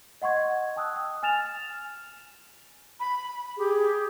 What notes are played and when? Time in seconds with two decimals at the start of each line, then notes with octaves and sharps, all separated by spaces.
0.22 D#5 F#5 C6 C#6 G#6
0.76 G5 A5 D#6 E6 F#6
0.96 E6
1.23 G#5 F6 A6 E7 F7
2.99 B5
3.57 G4 G#4